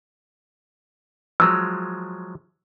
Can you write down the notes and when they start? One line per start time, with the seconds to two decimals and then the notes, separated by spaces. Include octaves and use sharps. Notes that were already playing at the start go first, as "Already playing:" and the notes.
1.40 F3 F#3 G#3 E6